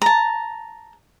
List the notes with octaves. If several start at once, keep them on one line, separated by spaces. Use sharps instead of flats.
A5 A#5